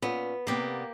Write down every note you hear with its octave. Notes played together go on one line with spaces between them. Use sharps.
A#2 B3 C#4
C3 A#3 B3 G4 D5